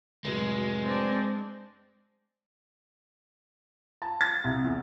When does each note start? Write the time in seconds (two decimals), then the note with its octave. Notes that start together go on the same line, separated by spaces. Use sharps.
0.24 F1 A2 F#3 G#3
0.83 C4 D4
4.02 A5
4.21 A6
4.44 C2
4.64 E2